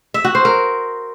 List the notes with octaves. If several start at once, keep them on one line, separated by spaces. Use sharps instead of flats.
E5
F#4
C5
A#4